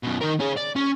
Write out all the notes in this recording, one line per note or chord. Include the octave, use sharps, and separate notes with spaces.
F#2 B2
D#3 A#4
C#4 G#4
D5
C#4